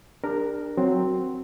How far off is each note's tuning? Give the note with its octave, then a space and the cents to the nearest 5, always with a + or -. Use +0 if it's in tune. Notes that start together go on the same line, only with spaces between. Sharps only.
D4 +15 G4 +45 A#4 +0
F#3 +0 C4 +0